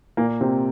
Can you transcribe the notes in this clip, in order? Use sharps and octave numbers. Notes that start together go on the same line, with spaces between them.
A#2 A#3
C3 C4